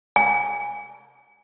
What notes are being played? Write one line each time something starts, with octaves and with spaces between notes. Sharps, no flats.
G#5